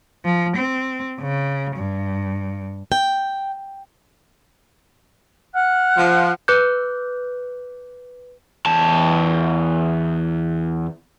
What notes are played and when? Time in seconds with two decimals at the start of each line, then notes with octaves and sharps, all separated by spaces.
0.24 F3
0.57 C4
1.20 C#3
1.76 G2
2.92 G5
5.54 F#5 F6 F#6
5.97 F3
6.48 B4 D6 F#6 G6
8.66 E2 A5